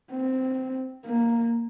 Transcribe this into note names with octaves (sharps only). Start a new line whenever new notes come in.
C4
A#3